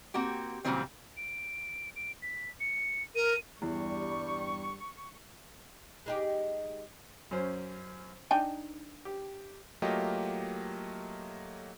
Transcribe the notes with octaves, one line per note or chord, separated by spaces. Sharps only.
A#3 C4 F#4 G4
A#2 C#3 E3 F#3 G3 C4
D7
D7
B6
C#7
A#4 D#7
E2 G2 G3 C#6
G#3 D#4 G4
F#2 C#4 C5
D4 D#4 G5 G#5
G4
F#3 A3 A#3 F4 G4 D#5